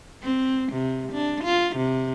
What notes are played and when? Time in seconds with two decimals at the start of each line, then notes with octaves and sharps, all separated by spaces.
0.23 C4
0.73 C3
1.12 D4
1.44 F4
1.76 C3